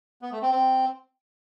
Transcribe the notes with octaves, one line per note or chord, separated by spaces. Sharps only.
B3
A3
C4
C4